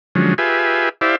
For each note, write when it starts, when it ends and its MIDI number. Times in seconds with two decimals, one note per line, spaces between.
0.15 0.34 50
0.15 0.34 53
0.15 0.34 54
0.15 0.34 56
0.15 0.34 61
0.38 0.89 65
0.38 0.89 67
0.38 0.89 68
0.38 0.89 71
0.38 0.89 76
0.38 0.89 80
1.01 1.16 64
1.01 1.16 67
1.01 1.16 72
1.01 1.16 74
1.01 1.16 76
1.01 1.16 77